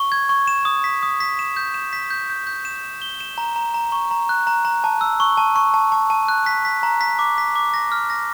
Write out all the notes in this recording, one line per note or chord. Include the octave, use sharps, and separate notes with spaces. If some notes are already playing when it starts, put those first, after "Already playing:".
Already playing: C#6
G#6
C#6
E7
D#6
B6
D#6
B6
E7
G6
E7
B6
G6
G6
G6
E7
E7
G7
E7
A#5
A#5
A#5
C#6
A#5
F#6
A#5
A#5
A5
E6
C#6
A5
C#6
A5
A5
A5
F#6
B6
B6
A#5
B6
D6
B6
D6
A#6
F6
A#6